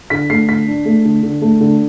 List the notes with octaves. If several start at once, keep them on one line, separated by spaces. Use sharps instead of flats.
D3 B6
A3 C7
D3 B6
D4
A3
D3
D3
A3
D3